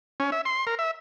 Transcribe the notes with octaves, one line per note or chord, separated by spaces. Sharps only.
C#4
E5
C6
A#4
E5